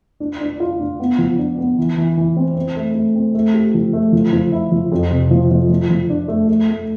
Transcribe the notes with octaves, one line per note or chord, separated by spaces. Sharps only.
D4
D4
F4
D4
B3
F3
D4
B3
E3
E3
E3
C4
C4
A3
A3
C4
A3
G4
F3
A3
F3
F3
E4
F3
F2
C3
F3
F3
F3
F3
D4
A3
A3
A3